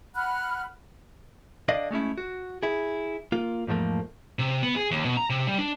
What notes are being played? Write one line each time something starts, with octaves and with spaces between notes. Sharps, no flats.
F#5 B5 F6 F#6
D3 D5 D#5 F5
G#3 A3 C#4 E4
F#4
E4 G#4
A#3 F4
E2 G#2 F3 A3 A#3
C3
B3
G#4
D#2
B2
A#5
C3
G3
D4